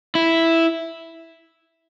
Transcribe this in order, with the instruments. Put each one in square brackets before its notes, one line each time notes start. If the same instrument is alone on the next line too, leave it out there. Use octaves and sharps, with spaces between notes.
[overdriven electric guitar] E4